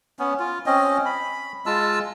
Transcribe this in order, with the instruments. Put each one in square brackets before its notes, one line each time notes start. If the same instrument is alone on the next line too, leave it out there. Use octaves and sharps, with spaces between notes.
[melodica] B3 C#4
F4
C4 C#4 D#5
B5
G#3 F4 A5 E6